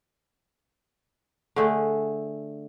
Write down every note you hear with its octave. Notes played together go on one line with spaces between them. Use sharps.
D3 A3 G#4